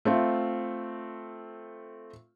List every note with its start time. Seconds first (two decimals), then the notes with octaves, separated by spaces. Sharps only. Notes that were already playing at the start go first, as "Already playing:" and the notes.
0.05 A3 C4 F4